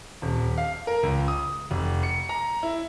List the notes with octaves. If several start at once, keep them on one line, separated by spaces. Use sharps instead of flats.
D#1
F5
A#4
C#2
D#6
F1
C#7
A#5
E4